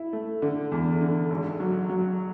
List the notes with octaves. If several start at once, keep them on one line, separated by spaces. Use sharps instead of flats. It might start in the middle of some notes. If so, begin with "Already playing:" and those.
Already playing: E4
A3
D3
E2
D3
G#1
F#3
F#3